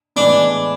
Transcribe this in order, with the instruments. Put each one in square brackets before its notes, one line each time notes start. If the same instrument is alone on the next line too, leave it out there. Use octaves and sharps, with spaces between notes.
[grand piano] A2 E3 G#3 B3 [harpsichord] D4